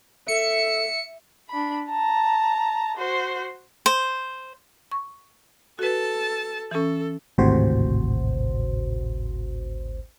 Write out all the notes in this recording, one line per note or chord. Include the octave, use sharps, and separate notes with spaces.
A4 E5 C#7
D4 B5
A5 A#5
F#4 C5
C5
C#6
F#4 A4 B4 A5
E3 C#4 A4
G#1 D2 A2 C3 F#4 C5